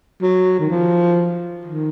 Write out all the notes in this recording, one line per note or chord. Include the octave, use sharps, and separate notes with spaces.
F#3
D#3
F3
D#3